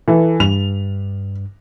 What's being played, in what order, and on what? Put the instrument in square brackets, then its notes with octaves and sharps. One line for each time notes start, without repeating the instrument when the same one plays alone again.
[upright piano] E3 [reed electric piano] A4
[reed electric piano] G2 [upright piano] F7